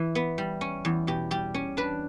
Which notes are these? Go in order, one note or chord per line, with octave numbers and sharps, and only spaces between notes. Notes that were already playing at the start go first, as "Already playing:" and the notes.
Already playing: E3
B3
G3
C#4
E2
B2 G4
G3 G4
C#4
D4 B4